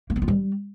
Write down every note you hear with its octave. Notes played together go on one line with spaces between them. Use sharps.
A#3
B3
F4
G3